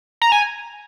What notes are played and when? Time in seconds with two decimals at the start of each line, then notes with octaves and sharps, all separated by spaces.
0.22 A#5
0.32 G#5